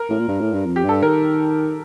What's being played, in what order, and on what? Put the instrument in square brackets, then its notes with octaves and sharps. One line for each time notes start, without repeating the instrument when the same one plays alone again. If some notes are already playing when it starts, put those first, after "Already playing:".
Already playing: [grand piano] A#4
[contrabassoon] A2
A#2
G2
A2
G2
F2
[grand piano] G4
[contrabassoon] G2 [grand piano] A4
[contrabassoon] D#3 [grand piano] A#4